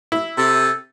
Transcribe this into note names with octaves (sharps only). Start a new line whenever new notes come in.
E4
C3 A4